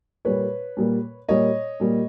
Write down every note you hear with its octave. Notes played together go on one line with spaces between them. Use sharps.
A#2 G3 A#3 B4 C#5
A#2 G3 A#3
A#2 G3 A#3 C#5 D#5
A#2 G3 A#3